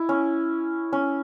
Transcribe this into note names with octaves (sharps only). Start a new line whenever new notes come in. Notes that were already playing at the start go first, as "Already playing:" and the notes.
Already playing: E4
C#4
C#4